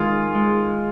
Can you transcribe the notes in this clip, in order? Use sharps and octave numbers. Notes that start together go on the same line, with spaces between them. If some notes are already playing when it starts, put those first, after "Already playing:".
Already playing: D#3 G#3 F4 G#4
G#3